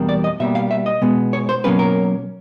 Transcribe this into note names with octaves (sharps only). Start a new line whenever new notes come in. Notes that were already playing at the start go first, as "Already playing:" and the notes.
Already playing: E2 B2 G3 A#3 D4
D5
D#5
B2 G3 A#3 E5
F5
E5
D#5
B2 G#3 B3
C#5
C5
B2 F#3 A#3 C#4 B4
A#4